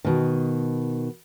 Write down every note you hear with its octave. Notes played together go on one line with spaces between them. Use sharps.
B2 D#3